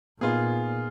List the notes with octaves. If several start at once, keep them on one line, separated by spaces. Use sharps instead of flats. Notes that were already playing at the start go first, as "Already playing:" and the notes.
A#2 A#3 B3 D#4 F4 G#4